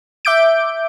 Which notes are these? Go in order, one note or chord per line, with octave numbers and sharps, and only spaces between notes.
E5 D6 G6 D7